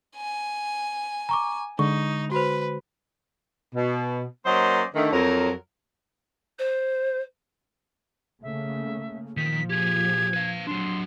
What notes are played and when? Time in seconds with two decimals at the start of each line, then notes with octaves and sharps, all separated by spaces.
0.16 G#5
1.29 A#5 C#6 D6
1.79 D3 G#3 D#4 C#6
2.32 F#4 B4 C5
3.75 B2
4.46 F#3 A#3 C#4 C5 D5 D#5
4.95 D3 D#3 A3
5.12 F2 F#3 A#4
6.59 C5
8.43 C#3 A3 A#3 E5
9.37 A#2 D#3 F3 B6
9.70 G4 G#4 G#6
10.34 B4 F5
10.67 F#3 D4 C6